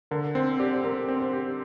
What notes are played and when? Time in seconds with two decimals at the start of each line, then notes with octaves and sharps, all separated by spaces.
0.11 D3 A#4
0.35 C4 C5
0.59 G4 D5
0.75 C5
0.84 C4 A#4
1.09 C4
1.20 C5
1.33 G4